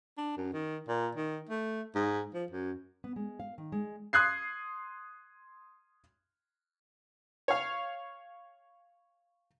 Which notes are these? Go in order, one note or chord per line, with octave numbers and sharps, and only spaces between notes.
D4
F#2
D#3
A#2
D#3
A3
G#2
F3
F#2
B3
G#3
F5
D#3
G#3
C6 D#6 F#6 G#6 C7
C#5 F5